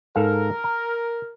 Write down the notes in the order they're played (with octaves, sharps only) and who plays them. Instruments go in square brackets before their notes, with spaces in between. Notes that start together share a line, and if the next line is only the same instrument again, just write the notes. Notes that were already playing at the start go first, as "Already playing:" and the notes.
[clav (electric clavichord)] G#2 A4 F5 [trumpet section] A#4
[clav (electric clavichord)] A#5